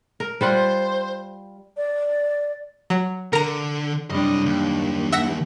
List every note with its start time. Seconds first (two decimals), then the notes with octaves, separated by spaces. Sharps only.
0.20 A#4
0.41 G3 F4 C5 F#5
1.77 D5
2.90 F#3
3.33 D3 A#4 A#5
4.10 C2 F#2 G3 D4 D#5
4.46 D#2
5.12 E5 F#5 A#6